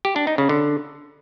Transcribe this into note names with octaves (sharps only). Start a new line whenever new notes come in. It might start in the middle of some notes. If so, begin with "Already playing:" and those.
G4
D4
D#4
C#3
D3